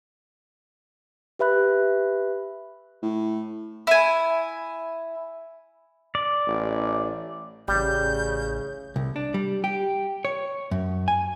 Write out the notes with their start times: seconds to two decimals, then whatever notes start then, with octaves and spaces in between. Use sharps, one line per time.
1.39 G4 B4 E5 B5 F#6
3.03 A2
3.87 E4 G#5
6.15 D5
6.48 A1
7.68 A1 C#3 G3 G6
8.96 C2
9.16 D4
9.34 G3
9.64 G4
10.25 C#5
10.71 F#2
11.08 G#5